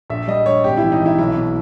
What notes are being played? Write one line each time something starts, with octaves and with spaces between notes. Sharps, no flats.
A#1 E5
G3 D#5
A#1 C#5
G#1 G4
E4
E3
D#4
E3 E4
B1 E4
B2